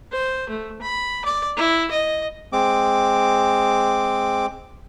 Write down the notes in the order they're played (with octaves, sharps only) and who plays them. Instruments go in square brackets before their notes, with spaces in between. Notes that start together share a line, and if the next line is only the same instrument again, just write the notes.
[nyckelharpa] C5
A3
B5
D5
E4
D#5
[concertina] G#3 C4 D6